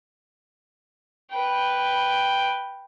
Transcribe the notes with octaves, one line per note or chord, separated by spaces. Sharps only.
B4 G5